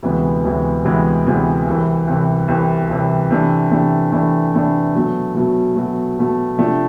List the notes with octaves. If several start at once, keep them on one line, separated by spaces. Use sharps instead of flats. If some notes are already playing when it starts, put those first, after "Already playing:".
D2 C3 E3 G#3 B3
D2 C3 E3 G#3 B3
D2 C3 E3 G#3 B3
D2 C3 E3 G#3 B3
C2 C3 E3
C2 C3 E3
C2 C3 E3
C2 C3 E3
C3 E3 A3 D4
C3 E3 A3 D4
C3 E3 A3 D4
C3 E3 A3 D4
B2 F#3 A3
B2 F#3 A3
B2 F#3 A3
B2 F#3 A3
C3 F3 A3 D4